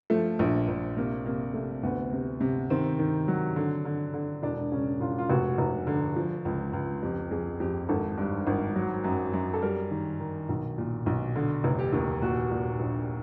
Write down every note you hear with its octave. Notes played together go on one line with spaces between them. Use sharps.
F3 A3
A#1
A#1
C3 A#3
C3 A#3
C3 A3
D2 B3
C3
C3
D#3 C4
D#3
F#3
D3
D3
D3
E1 D4
C#3 C#4
E1 F4
F4
F1 F#4
F1
D3
F3
C#2
C#2
F2 G4
F2 G#4
F2 G4
G#1 A4
G2
G#1
F#3
F#2
F#2
A4
G3 A#4
D#3
D#3
B1
A#2
B1
D3
F1
G4
D#2
A#2 F#4
A#2
A#1